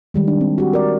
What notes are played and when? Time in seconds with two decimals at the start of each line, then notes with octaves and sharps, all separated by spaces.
0.14 D#3 G3 G#3
0.28 D4
0.41 C4
0.58 F#4 G4
0.73 A#4 D5